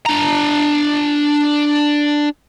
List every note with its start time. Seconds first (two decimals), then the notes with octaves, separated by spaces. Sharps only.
0.06 D4 A#5